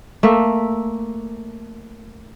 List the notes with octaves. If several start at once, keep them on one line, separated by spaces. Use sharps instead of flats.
A3 A#3 E5